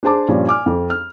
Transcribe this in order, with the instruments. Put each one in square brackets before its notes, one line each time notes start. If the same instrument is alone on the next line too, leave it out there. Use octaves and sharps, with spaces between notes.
[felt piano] D4 G#4 C5 A5 D6
G2 A#2 F3 C#4
G#5 D6 F6
F2
F6